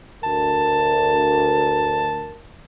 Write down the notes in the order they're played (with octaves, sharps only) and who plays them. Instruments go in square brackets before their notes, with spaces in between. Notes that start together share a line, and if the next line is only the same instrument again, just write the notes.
[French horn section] D2 A#4 [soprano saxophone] A5